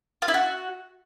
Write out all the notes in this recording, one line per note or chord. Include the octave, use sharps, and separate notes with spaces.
F4
E4
F#4